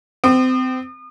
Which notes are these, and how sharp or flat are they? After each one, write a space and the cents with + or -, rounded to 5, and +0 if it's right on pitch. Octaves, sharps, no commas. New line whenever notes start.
C4 -30 D#6 -40